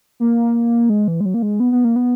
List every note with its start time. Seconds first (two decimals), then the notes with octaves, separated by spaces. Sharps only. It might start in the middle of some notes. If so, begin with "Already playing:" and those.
0.20 A#3
0.89 G#3
1.08 E3
1.20 G#3
1.25 F#3
1.34 A#3
1.42 G#3
1.60 B3
1.72 B3
1.84 A#3
1.96 B3